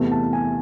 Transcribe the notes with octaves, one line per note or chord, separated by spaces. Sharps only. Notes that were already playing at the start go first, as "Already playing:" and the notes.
Already playing: E2 C3 E3 A3
A5
G#5